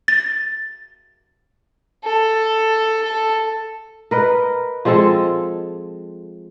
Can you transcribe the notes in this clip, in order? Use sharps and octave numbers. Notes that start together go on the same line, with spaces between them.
A6
A4
A4
A#4 B4 D#5
F3 G#3 C4 A4